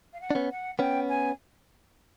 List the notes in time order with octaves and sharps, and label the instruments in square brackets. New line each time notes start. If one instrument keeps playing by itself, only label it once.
[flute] F5
F#5
[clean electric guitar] D4
B3 C#4
[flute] F#5
[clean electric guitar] B3 C#4 [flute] G5
[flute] G#5